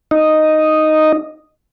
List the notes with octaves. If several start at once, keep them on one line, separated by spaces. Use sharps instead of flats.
D#4 D#5